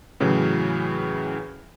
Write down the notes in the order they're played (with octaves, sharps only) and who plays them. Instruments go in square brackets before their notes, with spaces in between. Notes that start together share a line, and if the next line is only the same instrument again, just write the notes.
[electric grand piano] A2 C#3 E3 F#3